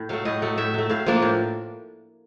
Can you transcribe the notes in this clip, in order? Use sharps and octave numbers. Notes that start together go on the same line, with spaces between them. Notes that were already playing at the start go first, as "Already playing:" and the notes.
Already playing: A2
F#3 A3 F5
A2 D#5
F#3 A3
A2 E5
F#3 A3
A2 F5
F3 A#3 D4
A2